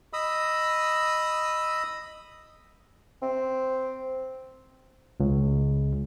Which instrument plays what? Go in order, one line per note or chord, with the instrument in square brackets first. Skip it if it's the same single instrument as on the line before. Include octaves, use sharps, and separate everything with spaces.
[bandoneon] D#5 B5 D#6 E6
[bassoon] C4
[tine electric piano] C#2